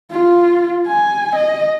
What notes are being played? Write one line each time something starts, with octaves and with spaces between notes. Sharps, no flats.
F4
G#5
D#5